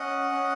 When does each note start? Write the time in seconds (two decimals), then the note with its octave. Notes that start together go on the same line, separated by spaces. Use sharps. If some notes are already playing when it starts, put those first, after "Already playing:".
Already playing: C#4 D#5 F#5
0.31 C#4